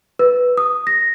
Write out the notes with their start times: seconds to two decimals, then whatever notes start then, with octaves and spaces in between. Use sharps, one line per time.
0.19 B4
0.57 D#6
0.87 A#6